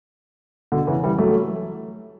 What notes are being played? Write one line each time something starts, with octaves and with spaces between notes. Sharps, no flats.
B2 D3
C#3 E3
E3 G3
F#3 A3